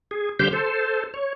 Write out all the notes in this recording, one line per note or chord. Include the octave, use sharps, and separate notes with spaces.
G#4
D3 G3 G4 C5 F5 G6
A4 C5
C#5